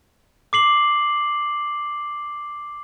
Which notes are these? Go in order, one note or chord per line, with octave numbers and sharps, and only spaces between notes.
D6 C7 F#7